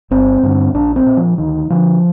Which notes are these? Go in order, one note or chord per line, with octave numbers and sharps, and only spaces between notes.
G1 C4
G2 D3
A#1 D4
C4
A#2
F3
D2 D#3
D3 F3